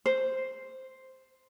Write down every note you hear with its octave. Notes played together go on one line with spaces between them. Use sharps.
C5